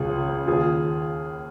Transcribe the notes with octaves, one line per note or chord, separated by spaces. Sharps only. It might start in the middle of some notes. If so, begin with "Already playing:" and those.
Already playing: C#2 F3 F4 G#4
C#3
C#3
D#2 F4 G#4